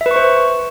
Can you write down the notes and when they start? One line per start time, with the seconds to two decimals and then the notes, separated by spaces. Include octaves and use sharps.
0.01 E5
0.06 B4
0.11 C#6
0.16 C5